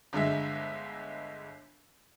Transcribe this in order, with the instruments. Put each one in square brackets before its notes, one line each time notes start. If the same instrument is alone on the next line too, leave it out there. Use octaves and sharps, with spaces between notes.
[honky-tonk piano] G1 D3 G#3 E5